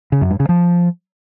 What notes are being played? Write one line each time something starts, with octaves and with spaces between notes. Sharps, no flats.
C#3
F#2
G2
C#3
F3